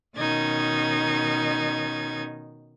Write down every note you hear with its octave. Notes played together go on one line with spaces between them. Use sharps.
B2 D#3 C#4 D#4 G#6 A6